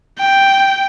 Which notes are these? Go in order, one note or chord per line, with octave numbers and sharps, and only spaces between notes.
G5